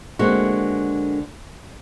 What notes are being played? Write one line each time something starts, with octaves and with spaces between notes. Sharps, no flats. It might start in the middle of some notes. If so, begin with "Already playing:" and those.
D3 G#3 A#3 C4 F#4